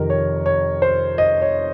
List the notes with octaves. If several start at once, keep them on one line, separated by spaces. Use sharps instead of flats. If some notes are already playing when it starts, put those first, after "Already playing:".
Already playing: F2 C3 D#3 A#4
C#5
C#5
C5
D#5
C#5